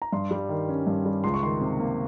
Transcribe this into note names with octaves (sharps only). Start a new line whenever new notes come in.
A#5
G2 C6
G3
D#3
C#4
G2
G3
C#2 C6
C#6
D#3 C6
C3
A#3